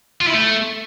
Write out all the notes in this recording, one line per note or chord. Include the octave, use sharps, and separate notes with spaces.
F4
E4
A3